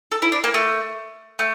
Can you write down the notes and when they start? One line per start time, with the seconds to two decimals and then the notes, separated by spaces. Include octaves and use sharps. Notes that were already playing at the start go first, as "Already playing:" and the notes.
0.12 A4
0.22 E4
0.32 D4
0.44 A#3
0.54 A3
1.39 A3